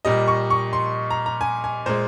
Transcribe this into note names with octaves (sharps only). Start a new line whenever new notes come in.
A#2 G3 D#5
C#6
C#6
C6
A#5
A#5
G#5
G#5
A#2 G#3 C5